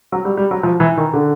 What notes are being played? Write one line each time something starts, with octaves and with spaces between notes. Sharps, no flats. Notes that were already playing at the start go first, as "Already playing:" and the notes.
F#3
G3
G3
F#3
F3
E3
D#3
D3